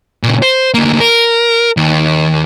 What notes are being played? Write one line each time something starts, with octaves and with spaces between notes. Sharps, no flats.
A#2 C#3
C5
D2 A#3
A#4
D#2